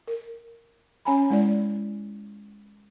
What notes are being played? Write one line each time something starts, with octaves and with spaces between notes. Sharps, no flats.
A#4
C#4 C#5 G#5 A#5 B5
G#3 E4 D5